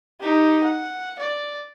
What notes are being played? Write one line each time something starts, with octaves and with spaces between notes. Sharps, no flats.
D#4 G4
F#5
D5